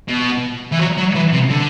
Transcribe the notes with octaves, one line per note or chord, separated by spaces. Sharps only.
B2
E3
F#3
F#3
E3
C3
D3